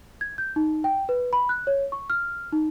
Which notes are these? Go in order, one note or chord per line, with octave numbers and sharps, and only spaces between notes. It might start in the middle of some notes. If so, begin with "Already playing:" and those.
G#6
G6
D#4
G5
B4
B5
F#6
C#5
C#6
F6
D#4